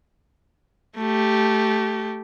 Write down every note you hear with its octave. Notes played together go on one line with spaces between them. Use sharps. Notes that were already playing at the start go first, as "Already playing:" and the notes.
A3 G4